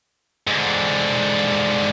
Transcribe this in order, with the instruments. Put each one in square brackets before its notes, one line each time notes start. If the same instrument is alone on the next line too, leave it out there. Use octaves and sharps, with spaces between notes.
[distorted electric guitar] G#2 D3